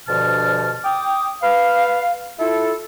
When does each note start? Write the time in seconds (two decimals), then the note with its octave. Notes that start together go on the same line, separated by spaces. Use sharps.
0.08 D2 G2 B2 F3 A5 F6
0.84 G5 D6 D#6
1.42 B4 F5
2.39 E4 F4 A4